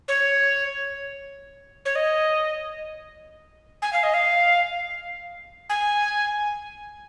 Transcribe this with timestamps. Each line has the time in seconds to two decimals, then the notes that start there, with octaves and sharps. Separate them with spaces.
0.08 C#5
1.85 C#5
1.96 D#5
3.82 G#5
3.93 F5
4.03 D#5
4.14 F5
5.70 G#5